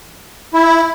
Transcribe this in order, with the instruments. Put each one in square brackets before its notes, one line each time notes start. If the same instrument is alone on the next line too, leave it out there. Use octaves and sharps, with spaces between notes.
[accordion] E4